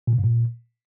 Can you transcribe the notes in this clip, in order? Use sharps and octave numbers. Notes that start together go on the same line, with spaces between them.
A#2
C3
G2
A#2